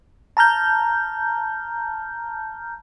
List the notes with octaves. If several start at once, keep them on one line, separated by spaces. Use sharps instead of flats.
A5 A#5 F6 G6